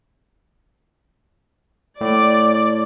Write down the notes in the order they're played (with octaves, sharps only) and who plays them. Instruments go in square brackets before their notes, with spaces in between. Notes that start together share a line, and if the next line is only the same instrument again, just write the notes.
[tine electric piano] A2 [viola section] D5